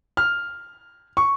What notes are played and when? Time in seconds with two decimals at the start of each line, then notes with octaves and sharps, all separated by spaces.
0.17 F6
1.17 C#6